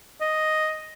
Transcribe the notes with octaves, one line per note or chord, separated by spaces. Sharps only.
D#5